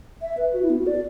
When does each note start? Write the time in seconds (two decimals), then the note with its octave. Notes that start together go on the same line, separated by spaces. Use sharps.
0.22 E5
0.37 B4
0.53 F#4
0.62 E4
0.70 B3
0.79 F#4
0.87 D5